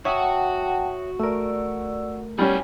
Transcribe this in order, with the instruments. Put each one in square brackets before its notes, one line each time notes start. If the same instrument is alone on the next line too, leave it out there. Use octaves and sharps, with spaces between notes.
[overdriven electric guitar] F#4 [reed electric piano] C#5 E5 D#6 [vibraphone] F#5 G5 A5
[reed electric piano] A3 A#4 [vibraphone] D5 E6
[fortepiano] G3 C#4 [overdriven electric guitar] F#4 G#4